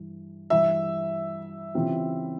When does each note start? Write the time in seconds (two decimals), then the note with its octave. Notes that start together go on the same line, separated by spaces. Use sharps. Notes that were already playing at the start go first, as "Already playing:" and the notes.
Already playing: G2 E3
0.50 G2 E3 G3 E5
1.74 C#3 E3 G3 C4 F4